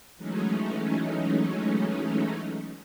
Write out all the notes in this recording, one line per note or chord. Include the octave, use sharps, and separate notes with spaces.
E3 F#3 G#3 A3 C#4 D#4